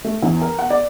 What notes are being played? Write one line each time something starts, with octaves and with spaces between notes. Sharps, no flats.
A3
E2
A#4
F#5
D5